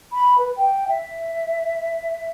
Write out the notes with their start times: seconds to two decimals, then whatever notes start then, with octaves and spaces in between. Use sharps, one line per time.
0.13 B5
0.38 B4
0.57 G5
0.89 E5